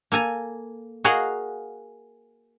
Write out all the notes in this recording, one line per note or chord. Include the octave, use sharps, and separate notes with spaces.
A#3 A4 G#5 A#5
F#4 G#4 A#4 D#5 F5 F#5